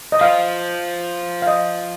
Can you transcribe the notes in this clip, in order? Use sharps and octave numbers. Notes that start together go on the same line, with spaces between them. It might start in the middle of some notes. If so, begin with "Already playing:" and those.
D#5
F3 F5
F5
D#5